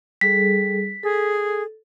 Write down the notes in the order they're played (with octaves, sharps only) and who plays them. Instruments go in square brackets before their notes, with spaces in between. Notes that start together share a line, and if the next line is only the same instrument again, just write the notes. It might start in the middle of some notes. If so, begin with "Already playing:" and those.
[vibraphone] G3 G#4 A4 [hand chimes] B6
[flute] G#4 [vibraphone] A4